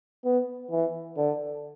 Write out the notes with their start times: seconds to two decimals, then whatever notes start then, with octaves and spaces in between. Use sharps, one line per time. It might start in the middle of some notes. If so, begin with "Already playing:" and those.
0.24 B3
0.71 E3
1.17 D3